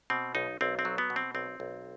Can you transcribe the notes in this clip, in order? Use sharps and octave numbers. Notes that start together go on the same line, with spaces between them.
B2 C4
B1 D#4
B1 C4
C4
F#3
B3
B2
C4
B1 C4
B1